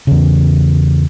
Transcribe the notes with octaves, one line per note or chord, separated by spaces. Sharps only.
E2 C#3